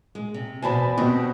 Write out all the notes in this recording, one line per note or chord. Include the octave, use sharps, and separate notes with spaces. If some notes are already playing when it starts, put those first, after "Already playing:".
G#3
C3
E2 B2 B3 F#4 C5 G#5 A5 B5
B2 C4 D4 F#4 G4 D#5